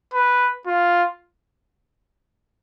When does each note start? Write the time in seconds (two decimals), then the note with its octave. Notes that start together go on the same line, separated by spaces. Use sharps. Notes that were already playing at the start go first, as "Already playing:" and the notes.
0.14 B4
0.67 F4